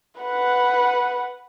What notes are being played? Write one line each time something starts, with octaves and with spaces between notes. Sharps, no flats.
B4 F#5